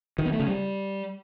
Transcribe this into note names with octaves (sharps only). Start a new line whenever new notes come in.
D#3
B3
A3
C#3
G3